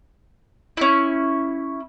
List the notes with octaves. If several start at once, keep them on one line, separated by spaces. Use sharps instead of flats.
C#4 E4